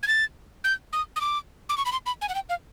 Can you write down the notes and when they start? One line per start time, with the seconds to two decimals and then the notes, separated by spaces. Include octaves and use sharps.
0.03 G#6
0.07 A6
0.64 G6
0.93 D#6
1.16 D#6
1.21 D6
1.69 D6
1.77 C#6
1.85 B5
1.92 C6
2.06 B5
2.21 G#5
2.29 F#5
2.35 G5
2.49 F5